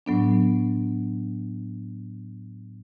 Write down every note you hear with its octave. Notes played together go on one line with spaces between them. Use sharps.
A2 F#3 B3 D4